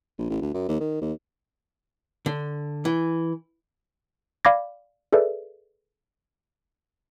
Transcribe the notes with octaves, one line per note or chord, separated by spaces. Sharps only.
A#1
A1
D2
F#2
D#2
D#3
D#2
D3
E3
D5 F5 B5 D6 G#6 A#6
G#4 A4 B4 D5 E5